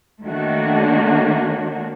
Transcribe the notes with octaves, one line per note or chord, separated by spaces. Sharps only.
D#3 A3 A#3 C#4 D4 F#4